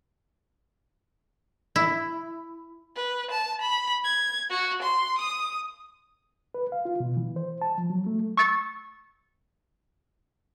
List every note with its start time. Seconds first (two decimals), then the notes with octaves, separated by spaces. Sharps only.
1.76 E4
2.96 B4
3.31 A5
3.61 B5
4.04 G#6
4.50 F#4
4.83 C6
5.18 D#6
6.54 B4
6.72 F5
6.85 F4
7.00 B2
7.17 E3
7.36 C5
7.62 A5
7.78 F3
7.90 F#3
8.06 A3
8.37 C#6 E6 A6 C#7